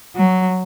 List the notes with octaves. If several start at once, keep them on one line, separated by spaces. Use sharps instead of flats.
F#3